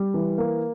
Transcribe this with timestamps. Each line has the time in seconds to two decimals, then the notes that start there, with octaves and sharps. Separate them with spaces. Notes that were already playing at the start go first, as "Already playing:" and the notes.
Already playing: G3
0.14 E3
0.38 A#3